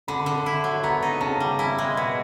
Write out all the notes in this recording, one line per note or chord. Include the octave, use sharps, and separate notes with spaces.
D3 B5
D3
E4
F#3
B3 A#5
D#4
C#3 A5
G3
E4 G#5
G#3
B2